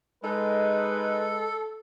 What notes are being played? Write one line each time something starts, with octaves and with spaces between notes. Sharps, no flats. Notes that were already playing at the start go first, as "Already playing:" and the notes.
G#3 D#4 A4 B4